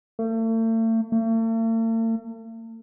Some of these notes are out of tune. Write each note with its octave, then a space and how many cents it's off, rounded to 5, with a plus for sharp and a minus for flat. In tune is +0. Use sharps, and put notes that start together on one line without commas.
A3 +40
A3 +45